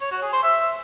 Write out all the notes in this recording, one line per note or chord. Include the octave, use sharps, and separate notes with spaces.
C#5
F#4
G#4
C5
E5